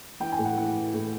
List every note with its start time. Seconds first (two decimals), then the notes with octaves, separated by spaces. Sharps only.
0.20 E3 G5
0.32 G#5
0.39 A2
0.45 F#5
0.57 E3 F#5
0.76 E3
0.94 A2